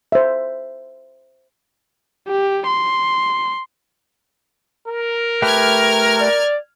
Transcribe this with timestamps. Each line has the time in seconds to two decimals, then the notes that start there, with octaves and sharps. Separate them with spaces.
0.12 C5 E5
2.28 G4
2.67 C6
4.88 A#4
5.42 A3 G4 B4 F6 G#6
6.21 D5